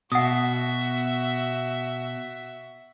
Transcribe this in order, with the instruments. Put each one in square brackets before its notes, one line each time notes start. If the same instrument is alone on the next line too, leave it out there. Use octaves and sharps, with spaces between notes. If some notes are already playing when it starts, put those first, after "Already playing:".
[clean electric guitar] B2 [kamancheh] F#4 E5 [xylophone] F#5 D#6